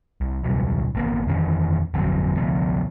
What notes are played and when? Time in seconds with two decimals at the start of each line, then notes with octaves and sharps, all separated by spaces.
0.21 C2
0.43 E1 C#2 F#3 G3
0.95 G#1 A#3 B3
1.27 F2 D#3 E3 C#4
1.94 G1 F2 C#3 F#3
2.37 D2 C3 F3 B3